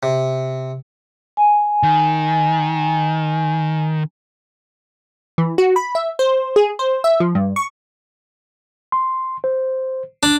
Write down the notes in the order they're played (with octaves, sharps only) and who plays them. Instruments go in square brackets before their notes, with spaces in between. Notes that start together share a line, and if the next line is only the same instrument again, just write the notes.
[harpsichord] C3
[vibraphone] G#5
[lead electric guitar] D#3
[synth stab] E3
F#4
B5
E5
C5
G#4
C5
E5
F3
G2
C#6
[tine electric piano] C6
C5
[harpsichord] D4